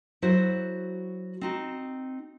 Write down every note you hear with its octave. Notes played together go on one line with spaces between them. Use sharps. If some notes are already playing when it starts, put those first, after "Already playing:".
F#3 E4 F#4 A4 C5
C4 D#4 F#4